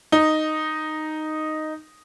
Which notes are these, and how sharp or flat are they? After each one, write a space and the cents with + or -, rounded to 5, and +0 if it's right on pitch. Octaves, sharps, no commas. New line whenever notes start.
D#4 -5